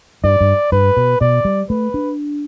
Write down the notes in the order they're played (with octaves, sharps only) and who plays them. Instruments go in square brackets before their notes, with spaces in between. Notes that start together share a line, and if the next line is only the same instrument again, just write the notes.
[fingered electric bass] G2 [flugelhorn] D5
[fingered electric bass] G2
[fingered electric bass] G2 [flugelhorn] B4
[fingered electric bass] B2
[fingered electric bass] B2 [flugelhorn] D5
[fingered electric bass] G3
[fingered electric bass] A3 [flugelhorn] B4
[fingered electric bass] D4